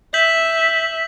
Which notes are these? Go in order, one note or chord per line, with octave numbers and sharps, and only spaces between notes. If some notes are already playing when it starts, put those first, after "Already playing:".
E5 G6 B6 F#7